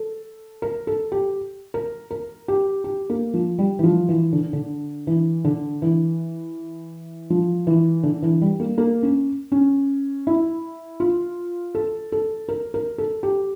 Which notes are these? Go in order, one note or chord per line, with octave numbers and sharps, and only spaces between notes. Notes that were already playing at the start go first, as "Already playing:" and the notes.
Already playing: A4
A#4
A4
G4
A#4
A#4
G4
G4
A#3
F3
G3
E3
F3
E3
D3
D3
E3
D3
E3
F3
E3
D3
E3
G3
A#3
A#3
C#4
C#4
E4
F4
A4
A4
A#4
A#4
A4
G4